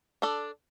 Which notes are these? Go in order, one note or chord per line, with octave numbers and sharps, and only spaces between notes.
D4 A4 D5